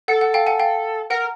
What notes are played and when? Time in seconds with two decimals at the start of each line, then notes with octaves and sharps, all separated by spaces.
0.08 A4 F#5
0.21 F#5
0.34 F5 G5
0.47 F#5 G#5
0.59 F5 G5
1.10 A#4 F#5